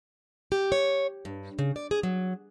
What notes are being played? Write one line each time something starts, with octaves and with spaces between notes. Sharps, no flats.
G4
C#5
G2
C#3
D5
G#4
F#3